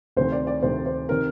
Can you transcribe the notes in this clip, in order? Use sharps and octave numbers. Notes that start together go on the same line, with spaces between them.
D2 C3 D#3 C5
D5
D5
D2 C3 D#3 C5
C5
C3 D#3 A#4